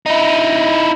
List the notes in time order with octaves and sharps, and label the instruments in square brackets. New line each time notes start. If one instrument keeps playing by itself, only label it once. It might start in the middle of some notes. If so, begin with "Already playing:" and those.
[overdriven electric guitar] D#4 E4